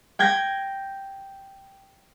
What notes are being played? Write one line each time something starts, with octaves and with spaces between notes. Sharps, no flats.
G5 G6 G#6 A#6